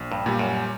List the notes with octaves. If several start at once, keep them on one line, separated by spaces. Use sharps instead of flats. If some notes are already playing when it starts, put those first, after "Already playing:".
Already playing: A#1
G2
A#2 G3
F#2